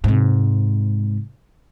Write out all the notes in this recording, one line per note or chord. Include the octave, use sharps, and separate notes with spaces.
G#2 C3